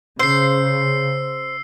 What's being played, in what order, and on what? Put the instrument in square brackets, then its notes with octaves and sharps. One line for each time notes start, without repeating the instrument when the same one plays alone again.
[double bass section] C#3 [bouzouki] C5 [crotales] E6 C7